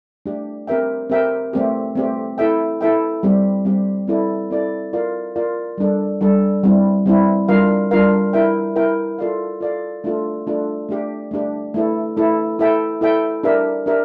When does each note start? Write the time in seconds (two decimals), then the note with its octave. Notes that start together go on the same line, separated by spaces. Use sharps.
0.26 A3 D4 G4
0.67 C4 G4 A#4 E5 G5
1.10 C4 G4 A#4 E5 G5
1.53 A3 C4 G4
1.95 A3 C4 G4
2.38 E4 A4 E5 G5
2.81 E4 A4 E5 G5
3.23 G3 C4 G4
3.65 G3 C4 G4
4.07 C4 E4 A4 D5
4.50 C4 E4 A4 D5
4.93 F4 A#4 D5 F5
5.36 F4 A#4 D5 F5
5.78 G3 D4 A4
6.21 G3 D4 A4
6.63 G3 C4 E4
7.06 G3 C4 E4
7.49 G3 D4 F4 A#4 F5
7.91 G3 D4 F4 A#4 F5
8.33 E4 A#4 E5 G5
8.76 E4 A#4 E5 G5
9.18 F4 A4 D5 F5
9.61 F4 A4 D5 F5
10.04 A3 D4 F4 A4
10.47 A3 D4 F4 A4
10.89 A3 D4 G4
11.31 A3 D4 G4
11.74 A3 E4 A4
12.17 A3 E4 A4
12.59 E4 A4 E5 G5
13.01 E4 A4 E5 G5
13.43 D4 G4 A#4 E5
13.86 D4 G4 A#4 E5